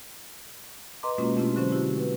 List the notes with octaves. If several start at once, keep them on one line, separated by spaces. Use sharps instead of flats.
B4 D#5 A#5 C6 D6
B2 G#3 A#3 C#4 F4 F#4
A3 C4 C#4 E4 F4 G4
D3 F#3 C#4 C5
A3 E4 F#4 G4
B4